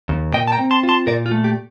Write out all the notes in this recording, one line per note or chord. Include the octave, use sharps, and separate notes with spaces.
D#2
A#2 D#5 G5
A5
G5 A#5
C4
A5 C6
F4
A5 C6
A#2 A#4 D5
F4
A3
G4